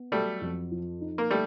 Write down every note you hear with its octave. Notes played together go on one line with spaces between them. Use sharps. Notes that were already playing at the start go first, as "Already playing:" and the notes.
Already playing: B3
F#3 G3 A3
F2
F3
D#4
A#3
G3 A3 A#3